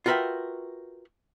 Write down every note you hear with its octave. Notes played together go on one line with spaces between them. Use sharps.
F4 F#4 A#4 B4 E5 G5